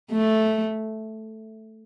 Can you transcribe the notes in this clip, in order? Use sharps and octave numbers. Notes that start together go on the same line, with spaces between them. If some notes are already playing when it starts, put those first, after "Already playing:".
A3